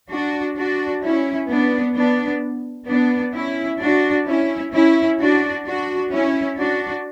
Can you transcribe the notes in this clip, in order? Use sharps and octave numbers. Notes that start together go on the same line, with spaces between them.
D4 F#4
D4 F#4
C#4 E4
B3 D4
B3 D4
B3 D4
C#4 E4
D4 F#4
C#4 E4
C#4 E4
D4 F#4
D4 F#4
C#4 E4
D4 F#4